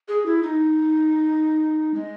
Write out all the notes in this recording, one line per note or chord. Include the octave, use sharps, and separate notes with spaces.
G#4
E4
D#4
G#3